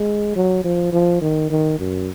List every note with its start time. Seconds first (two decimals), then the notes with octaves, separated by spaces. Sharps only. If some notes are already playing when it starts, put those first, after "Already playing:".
Already playing: G#3
0.36 F#3
0.64 F3
0.93 F3
1.21 D#3
1.50 D#3
1.79 F#2